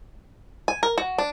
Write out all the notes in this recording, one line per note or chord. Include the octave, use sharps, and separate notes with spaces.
G#5
A#4
F#4
D4